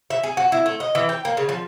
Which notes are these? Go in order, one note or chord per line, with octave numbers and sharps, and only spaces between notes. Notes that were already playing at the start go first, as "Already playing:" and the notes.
E5
G#4
F#4
E4
A3
D#5
E3
G5
A#3
C#3
F3